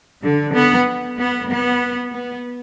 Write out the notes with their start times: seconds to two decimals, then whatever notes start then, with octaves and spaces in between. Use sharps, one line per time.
0.22 D3
0.54 B3
1.18 B3
1.50 B3
2.12 B3